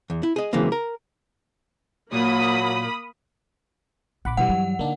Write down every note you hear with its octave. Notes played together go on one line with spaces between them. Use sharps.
E2
E4
G#4 D#5
C#3 E3 F#3 G#3 A#3 C4
A#4
A#2 F#3 A#3 B5 D#6
A#1 F#5 B5 D6
G2 B2 E3 F3 G3 F#5
F#3
D3 A#3 D4 D#4